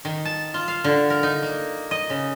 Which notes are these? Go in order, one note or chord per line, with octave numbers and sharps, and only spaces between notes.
D#3
A5
F4
F5
D3
A#4
D#4
A#3
D#5
C#3